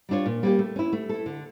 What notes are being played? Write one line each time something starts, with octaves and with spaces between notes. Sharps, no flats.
G3 D4 F4 C#5
A#2
G3 A#3 C#4 G4
A3
C#4 E4
A3
E4 A4
D3